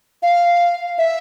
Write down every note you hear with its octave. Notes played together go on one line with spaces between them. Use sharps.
F5
E5